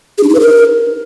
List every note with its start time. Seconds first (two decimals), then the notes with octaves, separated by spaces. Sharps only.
0.18 G#4
0.23 D4
0.29 D#4
0.34 B4
0.40 A#4